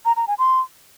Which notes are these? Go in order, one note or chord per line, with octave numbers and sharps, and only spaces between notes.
A#5
A#5
G#5
C6